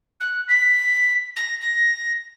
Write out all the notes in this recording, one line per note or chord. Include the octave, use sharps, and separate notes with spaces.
F#6
B6
A#6
A#6